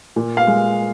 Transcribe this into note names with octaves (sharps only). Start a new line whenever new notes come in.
A#2
F5
G#3